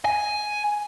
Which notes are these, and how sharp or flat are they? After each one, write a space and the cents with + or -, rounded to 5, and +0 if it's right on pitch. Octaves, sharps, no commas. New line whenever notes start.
G#5 +5